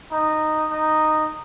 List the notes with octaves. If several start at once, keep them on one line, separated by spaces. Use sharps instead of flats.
D#4
D#4